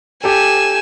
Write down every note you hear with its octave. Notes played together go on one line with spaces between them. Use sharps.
G4 A4 G#5 E7